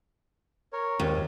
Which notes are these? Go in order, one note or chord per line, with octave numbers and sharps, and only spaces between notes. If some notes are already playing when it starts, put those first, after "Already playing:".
A#4 C#5
D#2 A2 G#3 C4